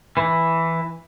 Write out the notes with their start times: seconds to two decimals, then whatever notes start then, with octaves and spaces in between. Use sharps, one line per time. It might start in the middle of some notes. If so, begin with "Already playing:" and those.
0.17 E3